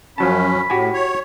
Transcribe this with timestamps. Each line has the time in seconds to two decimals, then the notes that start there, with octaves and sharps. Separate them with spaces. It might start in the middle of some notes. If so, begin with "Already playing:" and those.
0.18 F#2 F3 F#3 C#4 A5 B5
0.70 A2 F#4 G4 G#5
0.93 C#5